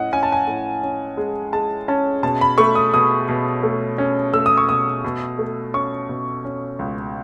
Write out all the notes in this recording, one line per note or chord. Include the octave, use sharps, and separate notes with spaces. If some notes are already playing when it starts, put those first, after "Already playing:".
Already playing: A2 C#4 D#5 F#5
C#4 G#5
A5
G#5
A2
C#4
G#3
G#3 A5
C#4 A5
B2 A5
B5
A3 C#6
D#6
B2 D#6
B2
A3
C#4
A3 E6
D#6
C#6
B2 D#6
B2
A3
C#4 C#6
B2
C#4
C#2